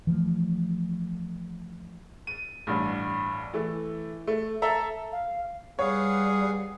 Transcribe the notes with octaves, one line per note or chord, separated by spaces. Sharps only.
E3 F3 A3
D#7
A1 G2
E3 A3
A3
A4 E5 A#5
F5
G3 G#4 B4 C#5 F5 F#5